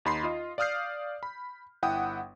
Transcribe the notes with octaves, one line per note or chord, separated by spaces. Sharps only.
D#2 D#4 B5 C6 C7
F4 D#5
D5 F5 D#6 F6 G6 C7
B5
G1 E4 F#5 G5 D#6